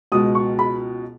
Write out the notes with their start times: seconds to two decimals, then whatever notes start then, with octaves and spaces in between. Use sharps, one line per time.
0.12 C#2 B2 G#3 D#6
0.35 C#6
0.59 B5